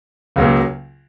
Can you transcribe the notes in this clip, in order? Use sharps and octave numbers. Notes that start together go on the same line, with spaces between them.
C#2 C#3 F#3 A#3